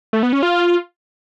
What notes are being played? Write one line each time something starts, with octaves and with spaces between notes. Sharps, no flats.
A3
B3
C#4
F4